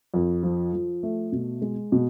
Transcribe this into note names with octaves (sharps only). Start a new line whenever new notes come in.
F2
F3
F3
A3
B2
G#3
B2